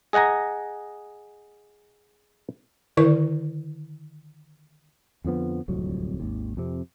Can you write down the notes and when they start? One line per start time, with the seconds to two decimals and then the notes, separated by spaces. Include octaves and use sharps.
0.13 G#4 D#5 F#5 G#5 A#5
2.97 D3 D#3 E4 A#4 D5 C#6
5.25 F2 D3 F3 B3
5.68 D1 C2 F2 F#3
6.20 G#1 D#2
6.57 F2 C3